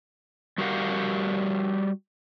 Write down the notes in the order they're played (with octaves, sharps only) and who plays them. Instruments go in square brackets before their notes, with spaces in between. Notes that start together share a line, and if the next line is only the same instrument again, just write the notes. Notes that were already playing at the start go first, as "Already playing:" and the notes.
[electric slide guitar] G3 F#4 G4 A#4 F5 F#5